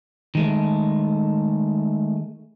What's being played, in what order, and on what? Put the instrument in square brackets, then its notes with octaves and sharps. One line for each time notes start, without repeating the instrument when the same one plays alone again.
[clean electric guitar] D#3 G#3 A3